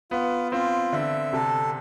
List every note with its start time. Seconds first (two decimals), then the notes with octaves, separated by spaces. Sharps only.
0.11 B3 F4
0.52 C4 F4
0.92 D3 E5
1.33 C3 A4